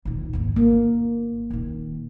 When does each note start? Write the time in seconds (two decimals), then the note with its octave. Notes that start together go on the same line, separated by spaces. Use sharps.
0.05 D#1 D#3
0.33 G#1 D#2
0.56 G1 A#3
1.50 D#1 D#3